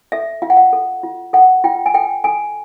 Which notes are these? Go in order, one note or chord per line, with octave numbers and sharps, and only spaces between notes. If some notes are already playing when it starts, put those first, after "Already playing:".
A4 E5
F4 F5
F#5
F5
A4
F4
A4 F#5
F4 G5
G#5
A4 G5
A4 G#5